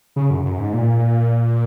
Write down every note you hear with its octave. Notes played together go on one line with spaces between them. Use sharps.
C#3
F#2
F#2
G#2
A#2